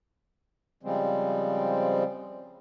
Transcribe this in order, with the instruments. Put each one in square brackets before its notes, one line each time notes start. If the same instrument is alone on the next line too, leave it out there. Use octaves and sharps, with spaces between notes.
[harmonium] C#3 F3 G3 G#3 C4